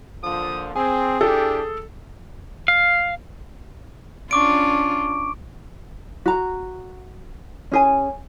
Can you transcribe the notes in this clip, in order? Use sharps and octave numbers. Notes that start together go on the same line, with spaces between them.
A#2 D3 F3 D#6
C4 G#4 G#5
D4 E4 G4 A4
F5
C#4 D4 F4 C#6 D6 D7
F#4 A#5
C#4 G#4 G#5